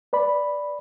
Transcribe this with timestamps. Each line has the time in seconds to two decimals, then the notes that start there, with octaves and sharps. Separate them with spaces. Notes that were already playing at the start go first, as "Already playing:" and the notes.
0.13 B4 D5 B5